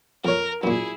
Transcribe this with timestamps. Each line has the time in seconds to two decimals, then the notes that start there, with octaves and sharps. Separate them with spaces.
0.25 F2 A#4 C#5
0.64 F#2 A#2 E4 G#4